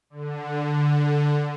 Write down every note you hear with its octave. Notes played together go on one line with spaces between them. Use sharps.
D3